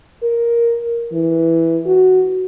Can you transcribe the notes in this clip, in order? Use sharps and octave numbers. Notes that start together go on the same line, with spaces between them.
A#4
E3
F#4